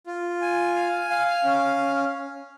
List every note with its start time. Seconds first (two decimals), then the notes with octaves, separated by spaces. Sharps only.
0.07 F4
0.41 G#5
0.76 F5
1.10 F5
1.44 C#4